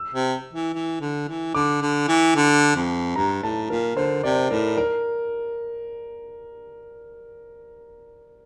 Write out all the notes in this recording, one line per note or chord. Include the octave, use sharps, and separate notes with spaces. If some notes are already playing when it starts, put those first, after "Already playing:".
Already playing: E6
C3
E3
E3
D3
E3
D3 D6
D3
E3
D3
F2
G2 A#5
A2 A5
A#2 A#4
D3 C5
C3 D5
A2 A#4
A#4